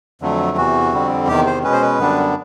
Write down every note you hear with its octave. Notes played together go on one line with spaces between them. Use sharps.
F2 D3 F#3 A3
E2 C3 E3 F#4
F2 D3 G3 C4
E2 C3 D#3 G4
C5
B2 G#3 C#4 B4
C5
B4
F#2 D3 G3 B3 D4